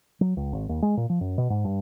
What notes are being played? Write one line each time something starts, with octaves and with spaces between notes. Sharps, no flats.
F#3
C#2
G#1
D#2
G#3
A#2
F3
F#2
B2
G#2
G2